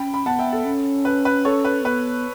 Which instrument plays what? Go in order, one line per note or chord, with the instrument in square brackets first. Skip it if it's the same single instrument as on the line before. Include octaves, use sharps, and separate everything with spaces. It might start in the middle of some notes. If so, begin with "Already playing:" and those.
Already playing: [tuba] C#4 [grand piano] G5 B5
[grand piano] B5
[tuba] B3 [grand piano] F#5 A5
[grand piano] E5 G5
A4
[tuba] C#4
[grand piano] B4
B4
A4 C#5
B4
[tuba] B3 [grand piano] B4